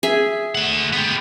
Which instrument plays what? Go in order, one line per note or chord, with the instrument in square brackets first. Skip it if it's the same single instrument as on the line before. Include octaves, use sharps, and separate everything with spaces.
[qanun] G#4 E5
[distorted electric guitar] A3 F#5
B3 G4